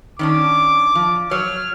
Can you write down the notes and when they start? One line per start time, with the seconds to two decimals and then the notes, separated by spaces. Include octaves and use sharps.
0.19 D#3 C#4 D4 D6
0.95 F3
1.31 F#3 C#5 F6